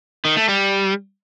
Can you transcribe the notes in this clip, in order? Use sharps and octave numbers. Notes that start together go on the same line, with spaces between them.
D#3
A3
G3